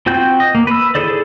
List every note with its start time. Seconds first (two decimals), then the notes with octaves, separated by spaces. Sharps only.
0.06 C4 F4 F#4 G5 G6
0.40 D#5
0.55 A#3
0.67 B4 E6
0.95 E4 G#4 A4 C5 D5